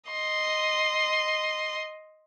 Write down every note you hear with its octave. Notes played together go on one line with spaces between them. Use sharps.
D#5 C6